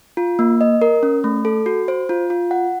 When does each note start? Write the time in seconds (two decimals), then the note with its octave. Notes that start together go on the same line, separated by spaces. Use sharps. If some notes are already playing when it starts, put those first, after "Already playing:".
0.17 F4
0.39 A#3
0.61 D#5
0.82 A#4
1.03 C#4
1.24 A3
1.45 A4
1.66 F#4
1.88 C5
2.09 F4
2.30 F4
2.51 F#5